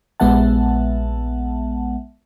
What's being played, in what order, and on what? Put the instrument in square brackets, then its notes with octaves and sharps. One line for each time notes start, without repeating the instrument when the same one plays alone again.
[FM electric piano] A#1 G#3 B3 E5 F#5 A5